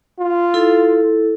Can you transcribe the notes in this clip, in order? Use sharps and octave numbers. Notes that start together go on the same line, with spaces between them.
F4
E4 A4